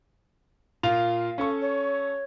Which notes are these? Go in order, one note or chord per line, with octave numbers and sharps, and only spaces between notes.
A#2 F4 F5 F7
C#4 A4 C#6
C#5